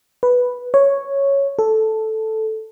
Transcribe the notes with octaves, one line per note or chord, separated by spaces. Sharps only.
B4
C#5
A4